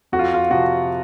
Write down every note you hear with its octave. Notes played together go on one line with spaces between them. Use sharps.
F2 F#4
F4
F4
C3 F3 F#4